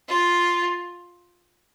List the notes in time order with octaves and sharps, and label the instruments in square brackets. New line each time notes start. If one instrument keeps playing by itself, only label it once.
[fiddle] F4